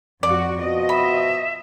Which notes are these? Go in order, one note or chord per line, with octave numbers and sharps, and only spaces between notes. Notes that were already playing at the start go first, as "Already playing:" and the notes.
F2 F#4 D5
B2 F3 F#4 D#5
E5 B5